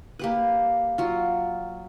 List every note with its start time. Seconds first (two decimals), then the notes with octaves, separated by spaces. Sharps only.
0.19 A#3 G4 B4
0.98 F#3 F4